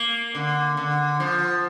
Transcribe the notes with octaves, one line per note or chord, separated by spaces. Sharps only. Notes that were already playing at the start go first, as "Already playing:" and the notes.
Already playing: A#3
D3
D3
F3